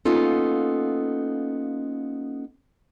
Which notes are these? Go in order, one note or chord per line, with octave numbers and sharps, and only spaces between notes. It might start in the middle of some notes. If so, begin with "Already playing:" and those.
A#3 B3 C#4 D#4 F4 A4